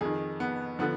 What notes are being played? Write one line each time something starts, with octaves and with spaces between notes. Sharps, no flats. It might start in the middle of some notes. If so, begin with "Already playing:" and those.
F2 D#3 G#4
B3
D3 F3 B3